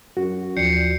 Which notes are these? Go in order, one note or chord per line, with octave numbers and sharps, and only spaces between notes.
F#2 F#4
D#2 F3 D5 G6 C7 C#7